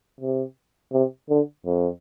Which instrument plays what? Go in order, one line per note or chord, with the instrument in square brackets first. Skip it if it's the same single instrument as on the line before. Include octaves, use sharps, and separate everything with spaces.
[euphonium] C3
C3
D3
F2